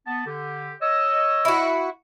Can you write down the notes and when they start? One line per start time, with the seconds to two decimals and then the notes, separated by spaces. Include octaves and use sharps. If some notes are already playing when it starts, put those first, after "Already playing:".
0.06 B3 A5
0.26 D3 G4
0.81 C#5 D#5 E6
1.45 E4 F#4